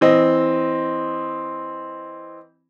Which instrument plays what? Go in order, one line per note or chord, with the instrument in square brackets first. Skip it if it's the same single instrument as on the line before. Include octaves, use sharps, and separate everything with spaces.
[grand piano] E3 C4 D#5